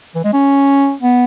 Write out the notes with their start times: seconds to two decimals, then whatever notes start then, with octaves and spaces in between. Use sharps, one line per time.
0.15 E3
0.24 G#3
0.34 C#4
1.01 B3